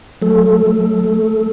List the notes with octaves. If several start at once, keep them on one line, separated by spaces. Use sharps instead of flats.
F#3 A3 A4
F#3
A3